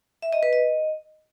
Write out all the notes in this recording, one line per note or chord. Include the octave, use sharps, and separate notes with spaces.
E5
D#5
B4
D#5